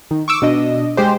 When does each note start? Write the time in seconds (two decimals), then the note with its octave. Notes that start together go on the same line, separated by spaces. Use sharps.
0.11 D#3
0.28 C#6 D6 E6
0.42 B2 D4 D#5
0.97 G#3 G4 C5